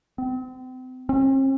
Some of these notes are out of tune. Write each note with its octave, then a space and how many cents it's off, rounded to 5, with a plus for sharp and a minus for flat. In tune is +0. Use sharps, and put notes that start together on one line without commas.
C4 -35
C4 +45